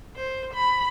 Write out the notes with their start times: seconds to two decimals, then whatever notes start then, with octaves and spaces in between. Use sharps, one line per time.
0.16 C5
0.54 B5